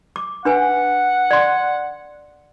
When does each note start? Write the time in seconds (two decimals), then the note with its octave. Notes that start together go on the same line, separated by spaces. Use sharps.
0.16 D6
0.45 D4 B4 F#5 G#5
1.31 D5 C6